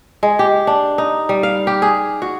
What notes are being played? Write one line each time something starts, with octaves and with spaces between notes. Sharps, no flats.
G#3
G4
D4
D#4
G3
F5
G4
G#4
F#4